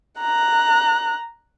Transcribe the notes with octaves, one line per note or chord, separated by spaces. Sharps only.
A#5 F#6